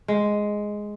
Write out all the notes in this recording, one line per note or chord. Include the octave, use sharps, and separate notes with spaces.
G#3